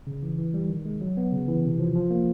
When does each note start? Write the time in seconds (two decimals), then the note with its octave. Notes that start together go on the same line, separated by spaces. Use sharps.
0.07 C#3
0.23 E3
0.39 E3
0.54 G3
0.69 D#3
0.86 G#3
1.01 F#3
1.17 B3
1.32 C#3
1.48 E3
1.64 C3
1.79 F3
1.95 F3
2.10 A#3